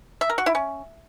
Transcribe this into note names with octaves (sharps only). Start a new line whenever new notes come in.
E5
A#4
F#4
E4
C#4